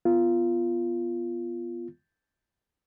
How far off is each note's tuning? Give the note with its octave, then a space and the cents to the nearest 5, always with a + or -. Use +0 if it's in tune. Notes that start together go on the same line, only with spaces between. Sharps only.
B3 +0 F4 -10